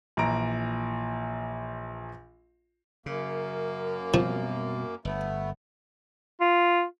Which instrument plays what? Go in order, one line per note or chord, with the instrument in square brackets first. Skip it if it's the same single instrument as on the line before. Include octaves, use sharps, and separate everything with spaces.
[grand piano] A#1 A#2 E3 A#5 D7
[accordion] F#2 A#3 [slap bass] C#3
[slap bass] B2 G3 C4 [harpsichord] F3
[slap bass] G1 [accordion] A3 B3
[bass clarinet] F4